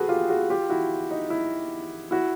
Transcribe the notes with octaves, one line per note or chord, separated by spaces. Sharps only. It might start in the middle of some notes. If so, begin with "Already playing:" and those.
Already playing: F#4 G#4 A4 B4
F4 G4
F#4 G#4
F4 G4
E4 F#4
D#4
E4
E4 F#4